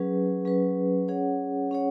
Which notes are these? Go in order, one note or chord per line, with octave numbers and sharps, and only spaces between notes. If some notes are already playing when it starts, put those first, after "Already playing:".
Already playing: F#3 C#4 G#4 B4
F#3 C#4 G#4 B4
C#4 G#4 C#5 F#5
C#4 G#4 C#5 F#5